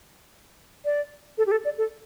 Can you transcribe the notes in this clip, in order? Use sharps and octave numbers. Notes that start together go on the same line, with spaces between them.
D5
A4
G4
A4
D5
A4